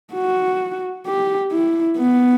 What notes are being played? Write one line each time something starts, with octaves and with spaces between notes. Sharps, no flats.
F#4
G4
E4
B3